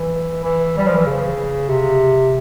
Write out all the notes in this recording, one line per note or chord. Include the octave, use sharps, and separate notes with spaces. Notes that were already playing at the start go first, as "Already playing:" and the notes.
Already playing: E3
E3
G3
F3
E3
C#3
C3